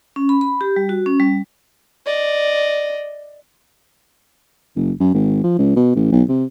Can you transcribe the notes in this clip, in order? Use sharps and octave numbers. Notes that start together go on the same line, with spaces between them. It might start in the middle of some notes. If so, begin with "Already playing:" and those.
C#4
B5
B5
G4
G3
F#4
C#4
G3
D5 D#5
F#1
F#2
G#1
F3
C#2
B2
A1
B1
C3